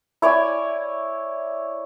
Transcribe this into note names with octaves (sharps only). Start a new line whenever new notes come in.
E4 C#5 D5 G#5